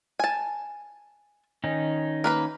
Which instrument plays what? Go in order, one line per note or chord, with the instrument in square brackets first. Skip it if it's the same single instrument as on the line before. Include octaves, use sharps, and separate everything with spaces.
[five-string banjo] G#5 A5
[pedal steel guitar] D#3 C#4 D#4
[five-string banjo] A#3 B4 B5